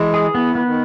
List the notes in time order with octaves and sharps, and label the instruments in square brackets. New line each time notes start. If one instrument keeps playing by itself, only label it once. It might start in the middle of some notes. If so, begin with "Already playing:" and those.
Already playing: [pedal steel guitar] E3 [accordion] G#3
[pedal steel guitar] G#4
[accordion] E3 [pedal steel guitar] B3
[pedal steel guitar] B3
[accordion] D#3